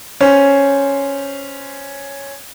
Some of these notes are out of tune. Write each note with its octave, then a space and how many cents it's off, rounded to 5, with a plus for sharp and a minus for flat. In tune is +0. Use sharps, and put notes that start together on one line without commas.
C#4 +0 C5 +0